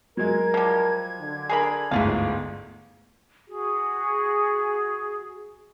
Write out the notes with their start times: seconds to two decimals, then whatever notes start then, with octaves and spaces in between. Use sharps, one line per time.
0.17 F#3 G#3 A#4 G#6
0.54 F3 G3
1.20 D3
1.49 G#4 A#4 B5
1.91 G1 D2 G#2 E4 F4 F5
3.47 F#4 G#4